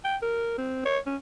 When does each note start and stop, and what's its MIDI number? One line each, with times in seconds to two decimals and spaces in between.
0.04 0.16 79
0.22 0.57 70
0.58 0.83 60
0.85 0.99 73
1.06 1.17 61